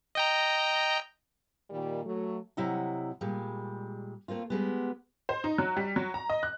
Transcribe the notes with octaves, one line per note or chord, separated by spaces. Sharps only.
D#5 G5 A#5
A#2 D#3 G3
F#3 A3
C3 F#3 E4 D#5 F#5
A#2 G3 G#3
A3 A#3 C4 F4
G3 G#3 B3
C5
D#4
F#3
G3
F#3
A#5
D#5
F#6